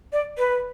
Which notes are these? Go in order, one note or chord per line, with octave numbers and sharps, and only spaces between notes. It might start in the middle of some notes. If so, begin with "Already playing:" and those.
D5
B4